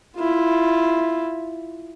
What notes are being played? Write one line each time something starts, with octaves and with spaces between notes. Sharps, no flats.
E4 F4